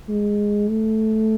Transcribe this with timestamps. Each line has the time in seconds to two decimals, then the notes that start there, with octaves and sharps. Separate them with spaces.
0.09 G#3
0.70 A3